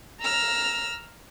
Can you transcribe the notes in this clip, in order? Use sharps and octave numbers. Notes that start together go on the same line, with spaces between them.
A#5 E6 F6